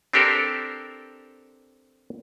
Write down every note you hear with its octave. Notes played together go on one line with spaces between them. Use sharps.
C4 D4 G4 A4 A#4 C5